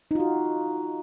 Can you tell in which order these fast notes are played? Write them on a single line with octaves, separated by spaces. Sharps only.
D#4 F4 F#4